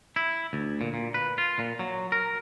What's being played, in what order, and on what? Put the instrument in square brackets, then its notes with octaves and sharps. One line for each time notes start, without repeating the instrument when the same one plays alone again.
[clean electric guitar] E4
D2
A#2
A#2
B4
F4
A#2
F#3
A#4